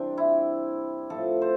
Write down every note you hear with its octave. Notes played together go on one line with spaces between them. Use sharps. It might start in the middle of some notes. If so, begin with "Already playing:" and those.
Already playing: C3 E3 G3 C4 D4
E4
A2 F3 A4
C5